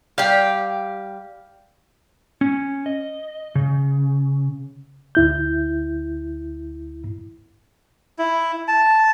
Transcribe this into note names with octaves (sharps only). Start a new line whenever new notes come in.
G3 G4 F5 G5
C#4
D#5
C#3
D2 E4 G6
E4
A5